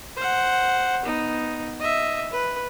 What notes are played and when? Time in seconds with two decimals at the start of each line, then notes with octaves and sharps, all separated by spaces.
0.17 C5 F#5
1.05 B3 D#4
1.80 D#5 E5
2.31 B4